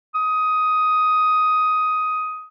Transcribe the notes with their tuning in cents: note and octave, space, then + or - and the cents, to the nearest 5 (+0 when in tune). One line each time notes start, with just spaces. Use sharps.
D#6 +10